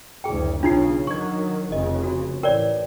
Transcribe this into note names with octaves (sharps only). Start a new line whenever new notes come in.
F#1 D2 G#4 G5
B1 C#3 D4 D#4 F4 C7
D#3 F#3 C#6 G#6
F1 C#3 D#5
F#4
A1 A#4 C#5 D5 G5